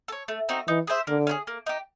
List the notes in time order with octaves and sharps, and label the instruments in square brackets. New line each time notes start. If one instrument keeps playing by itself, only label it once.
[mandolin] A4
C#5
A3
C4 D#4 F#4
[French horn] E3 [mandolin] D#4
[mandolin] G#4 C5 E5
[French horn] D3 [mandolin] A#3
[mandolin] C#4 F4 G#4
A#3
D#4 G4